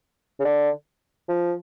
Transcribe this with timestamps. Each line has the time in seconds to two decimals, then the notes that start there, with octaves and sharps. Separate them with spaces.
0.40 C#3
0.45 D3
1.29 F3